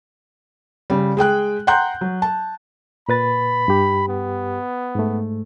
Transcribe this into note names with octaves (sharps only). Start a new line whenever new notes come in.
C#3 G3
G#3 G#4 G5 F#6
F#5 G5 A#5 C6 F#6 G6
F#3
A5
A#2 B4 B5 A6
G2 G4
B3
G#2 A3